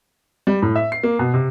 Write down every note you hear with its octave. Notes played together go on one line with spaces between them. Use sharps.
G3
A2
E5
C7
A#3
B2
C3